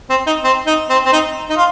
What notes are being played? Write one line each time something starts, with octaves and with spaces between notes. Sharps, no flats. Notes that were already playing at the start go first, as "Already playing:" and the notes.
C4
D#4
C4
D#4
C4
C4
D#4
D#4
F4